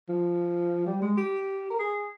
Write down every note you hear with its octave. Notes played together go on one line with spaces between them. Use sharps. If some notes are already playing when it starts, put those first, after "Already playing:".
F3
G3
G#3
G4
A#4
G#4